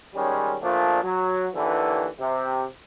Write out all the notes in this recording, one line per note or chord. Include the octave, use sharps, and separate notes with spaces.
D#3 G3 G#3 C#4
A#2 F3 A3 D4 F4
F#3
D#2 D3 E3
C3